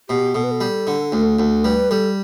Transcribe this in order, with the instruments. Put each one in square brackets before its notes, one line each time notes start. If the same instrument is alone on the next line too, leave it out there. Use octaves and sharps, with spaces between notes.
[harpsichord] B2 [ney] G4
[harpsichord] B2 [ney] A4
[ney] B4
A4
[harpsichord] G3
D3
D2
D2
[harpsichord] G3 [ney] B4
[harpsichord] G3 [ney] A4